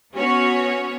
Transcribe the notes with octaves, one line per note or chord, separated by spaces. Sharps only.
B3 C#4 F#4 C#5